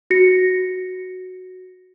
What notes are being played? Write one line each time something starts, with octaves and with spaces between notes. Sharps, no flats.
F#4 A#6 C#7